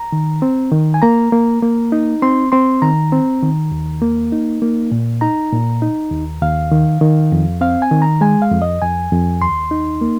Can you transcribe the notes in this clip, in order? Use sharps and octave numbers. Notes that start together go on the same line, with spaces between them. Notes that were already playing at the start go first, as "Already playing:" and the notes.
Already playing: A#5
D#3
C4
D#3
G#5
A#3 A#5
A#3
A#3
D#4
C4 C6
C4 C6
D#3 A#5
C4
D#3
D#2
A#3
D#4
A#3
A#2
D#4 A#5
A#2
D#4
D#2
D#2 F5
D#3
D#3
F2
C4 F5
G#5
D#3
A#5
G#3 G#5
F5
F2
D#5
F2 G#5
F2
D#2 C6
D#4
A#3